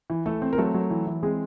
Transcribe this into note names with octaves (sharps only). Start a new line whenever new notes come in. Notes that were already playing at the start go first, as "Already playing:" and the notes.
E3
E3 A3 A4
C4
A#4
F#3 A3 A4
F#3
E3
E3
G#3 C4 G#4